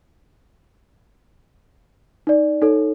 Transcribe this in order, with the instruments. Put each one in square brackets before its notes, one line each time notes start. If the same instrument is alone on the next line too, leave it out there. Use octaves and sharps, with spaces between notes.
[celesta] D#4 D5
D#4 A4 C#5